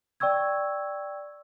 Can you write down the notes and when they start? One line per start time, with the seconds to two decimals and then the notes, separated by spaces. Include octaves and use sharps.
0.20 D5 G5 C#6 E6 G#6